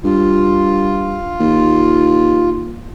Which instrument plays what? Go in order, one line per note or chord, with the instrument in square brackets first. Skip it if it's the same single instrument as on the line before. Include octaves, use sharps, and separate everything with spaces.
[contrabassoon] G2 [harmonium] F4
[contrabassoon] D#2